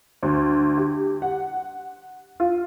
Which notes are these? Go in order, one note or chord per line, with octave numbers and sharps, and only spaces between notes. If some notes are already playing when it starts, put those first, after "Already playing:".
D2
G4
F#5
F4